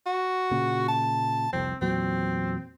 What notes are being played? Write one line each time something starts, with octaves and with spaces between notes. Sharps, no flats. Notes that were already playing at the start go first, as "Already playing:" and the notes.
F#4
A#2 C#3
A5
F1 C2 F2 C4
E2 A#2 F#3 C4